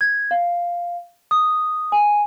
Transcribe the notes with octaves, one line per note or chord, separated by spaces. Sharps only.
G#6
F5
D#6
G#5